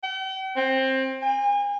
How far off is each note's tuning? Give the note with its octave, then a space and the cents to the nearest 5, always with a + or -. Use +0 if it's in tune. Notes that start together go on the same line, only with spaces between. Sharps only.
G5 -45
C4 +20
G#5 -35